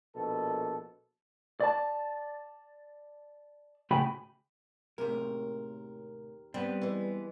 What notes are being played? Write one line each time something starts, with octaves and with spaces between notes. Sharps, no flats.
A#1 B2 A4
D5 A5
C#2 A2 F#4 G5 G#5 B5
D#2 A2 C3 G#3 A#4
G3 B3 C4 D4
E3 G#3